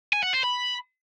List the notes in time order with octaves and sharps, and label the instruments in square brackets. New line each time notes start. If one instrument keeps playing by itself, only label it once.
[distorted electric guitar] G#5
F#5
C5
B5